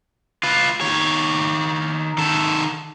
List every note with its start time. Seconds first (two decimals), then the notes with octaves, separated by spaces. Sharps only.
0.43 F4 B4
0.81 D#3 C#5
2.18 D#3 A4